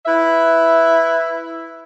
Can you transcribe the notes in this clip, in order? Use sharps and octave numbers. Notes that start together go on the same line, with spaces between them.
E4 B4 E5